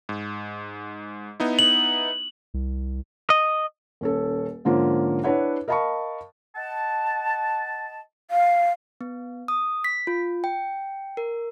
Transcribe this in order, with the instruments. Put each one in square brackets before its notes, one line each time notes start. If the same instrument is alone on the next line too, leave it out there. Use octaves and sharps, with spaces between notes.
[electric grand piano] G#2
B3 D#4 E4
[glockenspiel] F#7
[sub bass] C2
[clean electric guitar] D#5
[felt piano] D#1 C#4 A4
G#2 D3 F3 A#3 C#4 F4
D4 E4 B4 C#5 F#5
A#4 D#5 F5 A5 B5 C#6
[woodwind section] D#5 F#5 A5
[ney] F5
[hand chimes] B3
D#6
B6
F4
G5
A#4